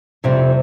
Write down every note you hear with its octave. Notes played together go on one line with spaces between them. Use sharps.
F2 C3 G3 C4